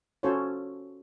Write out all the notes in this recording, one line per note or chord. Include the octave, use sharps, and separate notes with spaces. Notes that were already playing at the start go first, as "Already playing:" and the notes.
C#4 F4 F#4 A4 C5 C#5